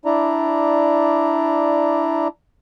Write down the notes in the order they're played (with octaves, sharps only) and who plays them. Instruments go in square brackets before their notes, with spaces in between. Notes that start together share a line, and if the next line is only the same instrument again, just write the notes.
[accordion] D4 E4 D5 A#5